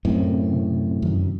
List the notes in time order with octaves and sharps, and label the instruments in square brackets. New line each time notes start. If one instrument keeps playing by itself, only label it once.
[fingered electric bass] F#2 A2 [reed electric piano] C4
[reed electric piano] C3
C3
C3
[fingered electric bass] F#2 [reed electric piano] D#3